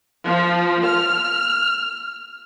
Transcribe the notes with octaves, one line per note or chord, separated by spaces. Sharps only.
F3
F6